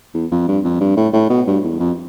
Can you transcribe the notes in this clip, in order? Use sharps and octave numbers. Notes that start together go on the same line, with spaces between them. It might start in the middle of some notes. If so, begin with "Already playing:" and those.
E2
F2
G2
F2
G2
A2
A2
B2
G2
E2
F2